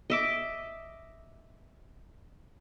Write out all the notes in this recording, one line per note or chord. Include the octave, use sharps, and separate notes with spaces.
D#5 E5 D6